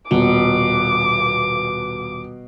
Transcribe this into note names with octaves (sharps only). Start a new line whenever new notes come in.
D#1 B2 D6